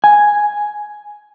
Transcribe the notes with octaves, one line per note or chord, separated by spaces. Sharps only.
G#5